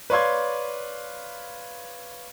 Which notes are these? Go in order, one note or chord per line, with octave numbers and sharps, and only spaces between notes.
B4 C#5 D5 F5 C6 G#6